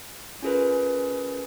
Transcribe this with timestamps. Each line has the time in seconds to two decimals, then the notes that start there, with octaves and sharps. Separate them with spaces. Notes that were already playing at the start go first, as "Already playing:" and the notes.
0.42 C#4 F4 G#4 A#4 B4